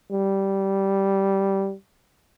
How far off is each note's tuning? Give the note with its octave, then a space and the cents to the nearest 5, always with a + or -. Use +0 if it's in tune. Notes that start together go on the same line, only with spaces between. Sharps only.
G3 -10